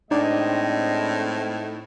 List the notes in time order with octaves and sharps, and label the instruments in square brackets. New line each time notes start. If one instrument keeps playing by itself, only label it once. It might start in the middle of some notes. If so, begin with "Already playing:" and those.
[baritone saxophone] A2 [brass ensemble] G#3 C4 D#5 [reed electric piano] D4 D5 [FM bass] D#4